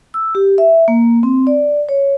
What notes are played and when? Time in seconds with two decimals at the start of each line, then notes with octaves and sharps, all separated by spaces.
0.14 E6
0.35 G4
0.58 E5
0.88 A#3
1.23 C4
1.47 D5
1.89 C#5